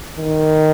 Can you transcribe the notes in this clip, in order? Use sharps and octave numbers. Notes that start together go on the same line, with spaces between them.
D#3